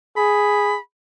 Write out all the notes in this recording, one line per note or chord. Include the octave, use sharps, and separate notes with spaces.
G#4 B5